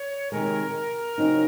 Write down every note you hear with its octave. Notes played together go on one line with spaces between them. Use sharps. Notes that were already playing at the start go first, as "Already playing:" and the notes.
Already playing: C#5
C3 D#3 G#3 A#4
C#3 F#3 C4 D#4